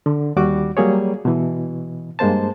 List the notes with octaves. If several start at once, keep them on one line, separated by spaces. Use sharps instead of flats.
D3
D#2 G3 F#4 D6
F#3 G3 A#3 G#4 C#5
B2 E3
G2 G#3 A#3 C5 A5